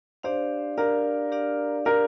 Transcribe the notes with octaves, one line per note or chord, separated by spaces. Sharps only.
D4 G4 C5 D5 F5
D4 G4 A#4 D5 F5
D4 G4 D5 F5
D4 G4 A#4 D5 F5